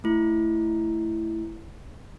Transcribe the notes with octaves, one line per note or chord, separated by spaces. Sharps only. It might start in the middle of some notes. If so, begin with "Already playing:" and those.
A3 E4